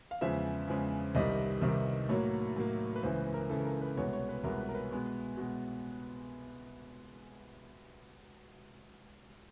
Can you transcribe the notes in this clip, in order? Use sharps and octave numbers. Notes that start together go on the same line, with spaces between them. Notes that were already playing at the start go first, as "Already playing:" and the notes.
F5
E2 C#3 F3 G#3 E5
E2 C#3 F3 G#3
C2 C3 D#3 G3 D#5
C2 C3 D#3 G3
A2 F#3 A#3 C#5
A2 F#3 A#3
B4
C#2 C#3 E3 C5
B4
A#4
C#2 C#3 E3 A4
A#4
B4
C2 B2 G#3 B3 C#5
C#5
B4
C2 B2 G#3 B3 A#4
B4
A#4
B4
B2 G#3 B3
B2 G#3 B3